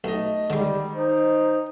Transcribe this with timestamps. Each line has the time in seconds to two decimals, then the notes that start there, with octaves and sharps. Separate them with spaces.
0.04 B1 A3 D#4 D#5
0.50 D3 D#3 G3 G#3
0.95 D#4 C5